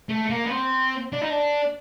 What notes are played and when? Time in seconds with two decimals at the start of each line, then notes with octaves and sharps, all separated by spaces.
0.09 A3
0.30 A#3
0.44 B3
0.51 C4
1.12 D4
1.21 D#4
1.30 D4